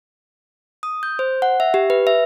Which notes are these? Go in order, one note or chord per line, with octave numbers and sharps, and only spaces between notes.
D#6
G6
C5
F#5
E5
G4
B4
E5